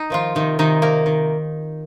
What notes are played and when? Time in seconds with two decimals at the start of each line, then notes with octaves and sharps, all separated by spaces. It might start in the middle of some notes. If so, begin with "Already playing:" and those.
Already playing: D#4
0.10 D#3 F3 F4
0.35 C3 D#3 D#4
0.59 C3 D#3 D#4
0.82 C3 A#3 A#4
1.06 D#3